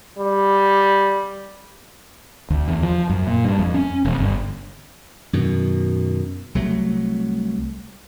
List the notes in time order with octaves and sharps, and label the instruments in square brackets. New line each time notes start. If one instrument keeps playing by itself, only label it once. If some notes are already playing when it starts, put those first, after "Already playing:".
[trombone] G3
[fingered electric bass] D2
E2
F3
F#2
A#2
G2
F2
C#4
E1
G1
[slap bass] F#2 B2 D#3
C2 F#3 A3